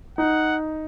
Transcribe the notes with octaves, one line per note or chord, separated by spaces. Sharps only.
D#4 F#5